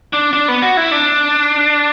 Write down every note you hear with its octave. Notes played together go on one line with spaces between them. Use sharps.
D4
D4
B3
F#4
E4
D4